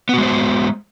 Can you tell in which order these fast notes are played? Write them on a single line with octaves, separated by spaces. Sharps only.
B3 F#4 G#3 C5